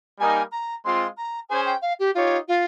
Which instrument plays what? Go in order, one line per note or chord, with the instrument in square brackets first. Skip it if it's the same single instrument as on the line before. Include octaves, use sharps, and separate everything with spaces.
[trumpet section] G3 A#3 D#4 A#4 [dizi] G#5
[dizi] A#5
[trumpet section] G#3 C4 F4 [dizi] C6
[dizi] A#5
[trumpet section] C#4 G#4 C5 [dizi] G#5
[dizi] G5
F5
G4
[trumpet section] D#4 G4 C#5 [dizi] F4
[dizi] F4